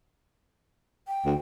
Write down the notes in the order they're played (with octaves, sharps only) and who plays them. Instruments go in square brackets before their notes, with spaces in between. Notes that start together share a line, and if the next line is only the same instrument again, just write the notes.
[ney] G5
[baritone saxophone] D2